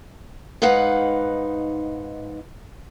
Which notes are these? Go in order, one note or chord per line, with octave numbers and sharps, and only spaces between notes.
G#2 D#4 B4 F5 F#5